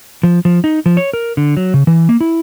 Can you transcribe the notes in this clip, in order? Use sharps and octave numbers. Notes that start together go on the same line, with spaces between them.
F3
F3
D#4
F3
C#5
A#4
D3
F#3
C#3
E3
A#3
E4